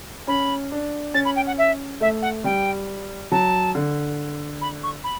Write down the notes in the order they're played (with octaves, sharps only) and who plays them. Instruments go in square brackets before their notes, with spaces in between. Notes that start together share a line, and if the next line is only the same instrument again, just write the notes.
[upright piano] C#4 [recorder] B5
[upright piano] D4
[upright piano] C#4 [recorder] A6
[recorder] B5
G5
F#5
E5
[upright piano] A3 [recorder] E5
[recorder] F#5
[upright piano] G3 [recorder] G5
[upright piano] F#3 [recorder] A5
[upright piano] D3
[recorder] B5
C#6
B5